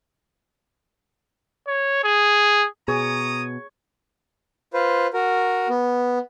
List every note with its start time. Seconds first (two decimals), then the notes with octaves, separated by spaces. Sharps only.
1.67 C#5
2.04 G#4
2.88 B2 G#4 C#5 A#5 D#6
4.73 F4 B4 C5
5.13 F#4 A#4
5.69 B3